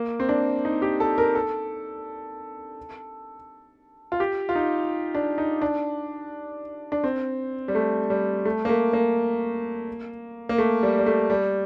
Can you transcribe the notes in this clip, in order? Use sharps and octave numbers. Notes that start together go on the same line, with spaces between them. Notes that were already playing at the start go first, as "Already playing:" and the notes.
Already playing: A#3
C4
D4
D#4
G4
A4
A#4
A4
F4
G4
F4
D#4
D4
D#4
D4
D4
C4
G3
A3
G3
A3
A#3
A3
A#3
A#3
A3
G3
G3
A3
G3